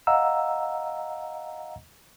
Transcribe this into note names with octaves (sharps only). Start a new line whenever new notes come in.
D#5 F5 F#5 A#5 E6